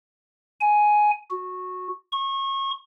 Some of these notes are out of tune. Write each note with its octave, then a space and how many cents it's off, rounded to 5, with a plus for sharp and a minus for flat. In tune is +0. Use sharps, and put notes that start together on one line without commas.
G#5 +10
F#4 -15
C#6 -30